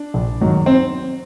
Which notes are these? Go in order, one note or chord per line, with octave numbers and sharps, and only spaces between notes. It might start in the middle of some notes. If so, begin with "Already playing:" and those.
Already playing: D4
A#1
G#2 D#3 F#3
C4